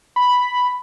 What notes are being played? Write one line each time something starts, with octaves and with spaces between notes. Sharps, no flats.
B5